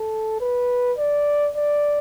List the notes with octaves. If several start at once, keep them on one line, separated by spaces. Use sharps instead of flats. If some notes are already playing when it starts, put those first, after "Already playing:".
Already playing: A4
B4
D5
D5